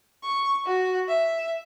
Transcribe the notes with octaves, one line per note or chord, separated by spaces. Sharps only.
C#6
F#4
E5